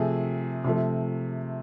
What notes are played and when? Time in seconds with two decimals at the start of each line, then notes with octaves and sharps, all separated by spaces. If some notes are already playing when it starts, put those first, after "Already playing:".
Already playing: C3 F3 A3 G#4
0.64 C3 F3 A3